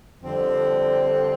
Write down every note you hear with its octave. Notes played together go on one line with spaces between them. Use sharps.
F2 D3 G3 C4